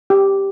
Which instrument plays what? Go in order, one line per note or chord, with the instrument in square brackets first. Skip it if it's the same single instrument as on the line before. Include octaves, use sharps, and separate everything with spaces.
[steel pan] G4